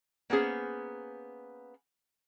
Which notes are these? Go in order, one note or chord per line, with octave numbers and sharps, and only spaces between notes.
A#3 B3 C#4 G#4 C5